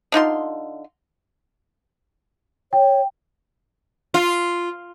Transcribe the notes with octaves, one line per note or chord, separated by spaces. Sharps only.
D3 D#4 F4 C6
C#5 G5
F4